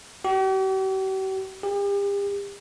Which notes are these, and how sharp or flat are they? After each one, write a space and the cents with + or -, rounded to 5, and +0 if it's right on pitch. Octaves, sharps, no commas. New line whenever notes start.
G4 -45
G4 +40